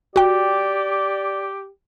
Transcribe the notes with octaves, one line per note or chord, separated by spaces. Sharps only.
F#4 G4 D5 G5